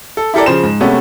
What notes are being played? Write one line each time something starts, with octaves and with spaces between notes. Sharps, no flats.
A4
E4 G4 A4 A#4 D5
C#3 F3 C5 E7
G#2
C3 G#3 A3 B3 C#4